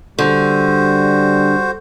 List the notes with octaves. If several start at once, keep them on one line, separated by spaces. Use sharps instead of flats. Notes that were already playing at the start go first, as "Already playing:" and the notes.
D3 G3 F#4 C5